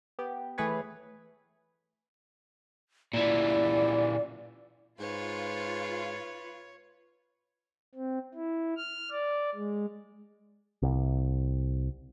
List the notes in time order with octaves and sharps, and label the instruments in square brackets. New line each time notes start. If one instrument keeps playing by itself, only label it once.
[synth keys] B3 G4
E3 A3 G#4 B4 C#5
[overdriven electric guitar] A#2 E3 [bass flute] D5
[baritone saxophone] G#2 [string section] F4 [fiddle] B4 [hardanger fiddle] C#5
[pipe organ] C4
E4
F6
D5
G#3
[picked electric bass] C2